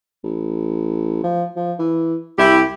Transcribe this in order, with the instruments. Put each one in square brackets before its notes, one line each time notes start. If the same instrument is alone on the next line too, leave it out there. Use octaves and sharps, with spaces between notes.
[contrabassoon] A1
F3
F3
E3
[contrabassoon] C2 [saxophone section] E4 G4